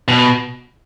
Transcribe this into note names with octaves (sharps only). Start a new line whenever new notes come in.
B2